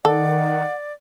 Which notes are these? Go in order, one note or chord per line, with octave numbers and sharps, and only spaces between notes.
D#3 A4 D5 F#5